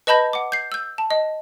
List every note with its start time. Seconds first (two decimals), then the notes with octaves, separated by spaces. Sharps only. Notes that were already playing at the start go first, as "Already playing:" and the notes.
0.07 B4 D#5 A5 B5 G6 A#6
0.33 F#5 D6
0.52 G6 C7
0.72 E6 G6
0.98 A5
1.10 D#5